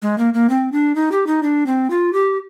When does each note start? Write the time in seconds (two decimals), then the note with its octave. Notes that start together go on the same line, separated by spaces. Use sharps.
0.02 G#3
0.18 A#3
0.34 A#3
0.49 C4
0.72 D4
0.95 D#4
1.12 G4
1.27 D#4
1.43 D4
1.66 C4
1.90 F4
2.13 G4